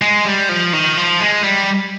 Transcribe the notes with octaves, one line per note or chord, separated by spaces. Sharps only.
G#3
G3
F3
D#3
F3
G#3
G3